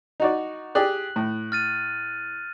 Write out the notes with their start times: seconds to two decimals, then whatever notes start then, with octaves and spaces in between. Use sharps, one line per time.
0.20 D#4 F#4 D5
0.75 G4 G#4 D5 F#6 F#7
1.16 A2
1.52 F6 A6 D#7